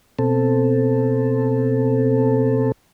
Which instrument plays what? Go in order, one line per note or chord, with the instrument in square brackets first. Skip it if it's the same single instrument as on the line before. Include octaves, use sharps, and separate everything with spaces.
[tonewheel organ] B2 C4 A4